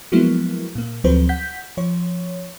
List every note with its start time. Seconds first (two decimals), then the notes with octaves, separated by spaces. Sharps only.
0.12 F3 F#3 G#3 A#3 B3 E4
0.75 A#2 A#3
1.04 D2 F3 F#3 C4 B4 C5
1.29 F#5 G6 B6
1.77 F3 C#5